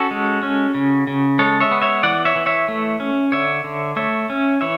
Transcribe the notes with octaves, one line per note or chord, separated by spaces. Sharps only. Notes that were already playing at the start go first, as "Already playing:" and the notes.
Already playing: C#4 F#4 A4
G#3
C#4
C#3
C#3
G#3 A4 C#5
C#5 E5
B3
C#5 E5
E3 D5 F#5
C#5 E5
E3
C#5 E5
A3
C#4
D3 C#5 E5
D3
A3 C#5 E5
C#4
E3 C#5 E5